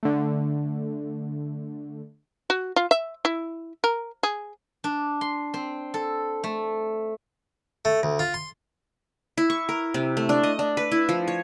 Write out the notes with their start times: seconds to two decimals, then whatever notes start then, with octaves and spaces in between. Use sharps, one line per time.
0.03 D3 A3
2.50 F#4
2.76 F4
2.91 E5
3.25 E4
3.84 A#4
4.23 G#4
4.84 D4
5.21 C6
5.54 C4
5.94 A4
6.44 A3
7.85 A3
8.03 D2
8.19 F4
8.34 C6
9.37 E4
9.50 C#6
9.69 A#4
9.94 C3
10.17 A3
10.29 D4
10.43 D#5
10.59 D4
10.77 B4
10.92 E4
11.09 F3
11.28 C#5